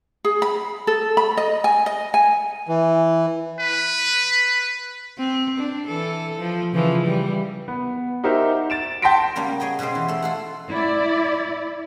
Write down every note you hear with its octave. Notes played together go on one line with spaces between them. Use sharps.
G#4
B5
A4
B5
D#5
G#5
D#5
G#5
E3
B4
C4
D4
E3 A4
F3
C#3 E3 F3
E3 G3
B3
D#4 F#4 G4 A#4 C5 E5
A6 D7 E7
G5 A5 C6 A#6 B6 D7
C#3 G3 A#3 B3 C#4
G#4 C#5 D#5 G5
B2 C#4 G4 G#4 C5
E3
A3 A4
F4 A4 F#5
E4 D5